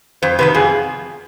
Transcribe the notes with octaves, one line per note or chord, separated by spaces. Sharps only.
F2 C5
C3 D#3 B3 B4
F2 G#4